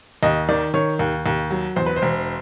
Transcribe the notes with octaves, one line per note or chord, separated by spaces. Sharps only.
D#2 D#5
D#3 D5
D#3 C#5
D#2
D#2
F#3
E2 C5
B4
C5
E1